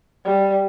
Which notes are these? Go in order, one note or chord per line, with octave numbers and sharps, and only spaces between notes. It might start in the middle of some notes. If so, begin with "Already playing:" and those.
G3